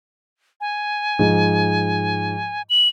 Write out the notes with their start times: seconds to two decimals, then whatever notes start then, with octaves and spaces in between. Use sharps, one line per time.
0.61 G#5
1.19 G#2 F3 G#3
2.70 F#7